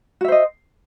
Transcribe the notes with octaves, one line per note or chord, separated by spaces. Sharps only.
F#4 C5 D#5 E5